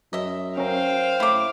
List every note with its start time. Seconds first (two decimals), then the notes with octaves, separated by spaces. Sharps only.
0.13 F#2 D#5 E5
0.58 C#4 A#4 C5 F5 G5
1.20 A2 E4 D6